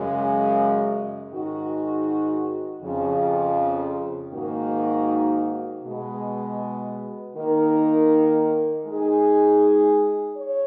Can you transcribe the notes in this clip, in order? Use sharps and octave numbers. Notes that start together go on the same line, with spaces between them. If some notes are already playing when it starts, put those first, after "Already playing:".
Already playing: F#2 C#3 G#3
G#2 D#3 G#3 D#4 F#4
F2 C#3 F3
G#2 D#3 A#3 D#4 F#4
B2 G#3 B3
D#3 A#3 D#4 A#4
G#3 D#4 G#4
C#5